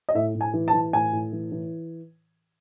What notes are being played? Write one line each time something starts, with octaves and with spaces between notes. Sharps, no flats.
D#5
A2 E5
A2
G#5
E3
A5
E3
A2 G#5
A2
E3
E3